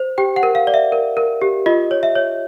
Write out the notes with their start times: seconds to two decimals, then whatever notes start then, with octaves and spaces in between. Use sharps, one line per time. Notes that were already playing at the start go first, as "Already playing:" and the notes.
Already playing: C5
0.18 G4 G5
0.36 F#5
0.43 A#4
0.55 F5
0.67 D5
0.74 E5
0.92 A#4
1.17 A#4
1.41 G4
1.66 F4 D#5
1.91 C#5
2.03 E5
2.15 C#5